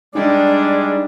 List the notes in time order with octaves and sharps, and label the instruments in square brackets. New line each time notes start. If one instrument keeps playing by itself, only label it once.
[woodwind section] G3 D5 [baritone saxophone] G#3 [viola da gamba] D4 [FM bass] D#4